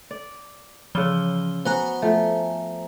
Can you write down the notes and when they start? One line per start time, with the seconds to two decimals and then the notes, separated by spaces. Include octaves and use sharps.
0.11 D5
0.95 C#3 E3 F3 D5 G7
1.65 B3 F#4 C5 F#5 G#5 A#5
2.02 F3 A3